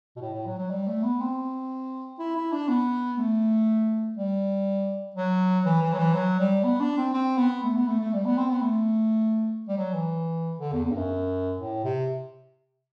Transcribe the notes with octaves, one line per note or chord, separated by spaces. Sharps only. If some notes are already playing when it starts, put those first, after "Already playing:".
B2
A2
A2
F#3
F#3
G3
A3
B3
C4
E4
E4
D4
B3
A3
G3
F#3
E3
E3
F#3
E3
F#3
G3
B3
D4
C4
C4
B3
A3
B3
A3
A3
G3
B3
C4
B3
A3
G3
F#3
E3
D3
E2
E2
G2
F#2
A2
C3